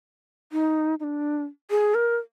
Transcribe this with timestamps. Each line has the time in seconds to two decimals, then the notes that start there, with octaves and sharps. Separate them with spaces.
0.52 D#4
1.00 D#4
1.04 D4
1.71 G#4
1.95 A#4